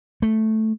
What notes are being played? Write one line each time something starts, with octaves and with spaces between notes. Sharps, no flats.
A3